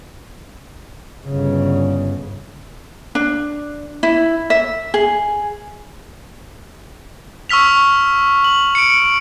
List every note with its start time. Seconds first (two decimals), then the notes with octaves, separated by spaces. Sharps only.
1.26 G1 C#3
3.15 D4
4.03 E4
4.50 E5
4.94 G#4
7.49 C#6 E6 F6 B6 F7
8.44 F#7
8.75 C#7 D7